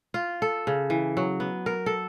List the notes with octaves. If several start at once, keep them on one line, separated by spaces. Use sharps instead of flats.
F4
A4
C#3
E3
F#3
B3
A#4
A4